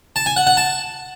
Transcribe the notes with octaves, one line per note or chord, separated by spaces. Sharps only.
A5
G#5
F#5
F#5
A5